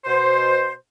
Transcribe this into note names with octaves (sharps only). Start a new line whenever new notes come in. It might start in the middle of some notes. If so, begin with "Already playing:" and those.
B2 C5